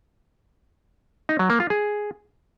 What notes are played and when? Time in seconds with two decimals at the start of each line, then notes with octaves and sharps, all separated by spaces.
1.29 D#4
1.39 F#3
1.50 A#3
1.60 F4
1.70 G#4